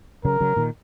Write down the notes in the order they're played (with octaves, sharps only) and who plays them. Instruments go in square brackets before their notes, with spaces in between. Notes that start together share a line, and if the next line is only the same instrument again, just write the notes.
[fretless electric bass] C#3 F#3 [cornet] A#4
[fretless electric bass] C#3 F#3
A#2 D#3